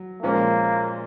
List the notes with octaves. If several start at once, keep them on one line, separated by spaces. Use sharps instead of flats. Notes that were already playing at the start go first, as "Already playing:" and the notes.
Already playing: F#3
A#2 F3 G#3 A#3 C#4